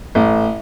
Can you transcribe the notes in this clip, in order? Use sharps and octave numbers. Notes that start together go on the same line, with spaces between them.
A1